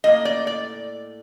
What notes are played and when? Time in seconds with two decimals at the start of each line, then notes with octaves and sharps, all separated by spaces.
0.04 A2 G3 A#3 D#5
0.25 D5
0.47 D5